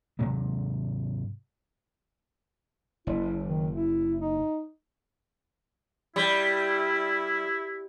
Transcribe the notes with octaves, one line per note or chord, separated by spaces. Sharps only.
G#2 C3 F#3 G#3
F#1 E4
D#3
E4
D#4
G3 E4